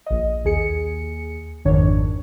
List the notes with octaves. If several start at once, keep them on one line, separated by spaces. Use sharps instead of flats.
A#1 D#5
D#2 G#4 C#7
G#1 F2 G#2 D#3 D4 C#5